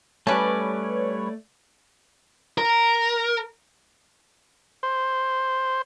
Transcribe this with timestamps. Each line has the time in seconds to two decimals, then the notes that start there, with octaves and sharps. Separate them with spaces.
0.27 G3 A3 C#4 B4 C#5 D5 A5
2.58 A#4
4.83 C5